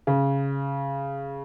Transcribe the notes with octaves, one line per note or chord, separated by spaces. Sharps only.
C#3